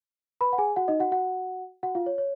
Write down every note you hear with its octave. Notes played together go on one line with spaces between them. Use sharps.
B4 B5
F#5
G#4 G#5
F#4 F#5
D#4 D#5
F#4 F#5
F#4 F#5
F#4 F#5
F4 F5
C#5
C#5